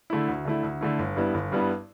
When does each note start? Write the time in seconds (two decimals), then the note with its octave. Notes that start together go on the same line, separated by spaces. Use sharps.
0.10 D3 A3 E4
0.28 D2
0.45 D3 A3 E4
0.63 D2
0.81 D3 A3 E4
0.99 G1
1.16 G2 G3 B3 E4
1.34 G1
1.52 G2 G3 B3 E4